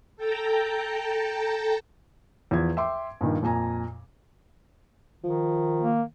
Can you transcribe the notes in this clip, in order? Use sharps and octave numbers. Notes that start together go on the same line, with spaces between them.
A4 G5 A5 A#5
E2 F3 G#6
E5 G5 C6 D6
G2 A#2 D#3
F2 A#2 G#5 A#5
D#3 F3
A#3